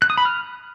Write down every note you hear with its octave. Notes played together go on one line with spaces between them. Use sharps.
F#6
D#6
B5
F6